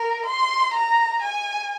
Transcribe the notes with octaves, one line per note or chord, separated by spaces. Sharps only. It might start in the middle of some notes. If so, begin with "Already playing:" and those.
Already playing: A#4
C6
A#5
G#5